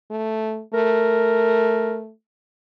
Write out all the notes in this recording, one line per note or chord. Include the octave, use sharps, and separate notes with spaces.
A3
A3 A#4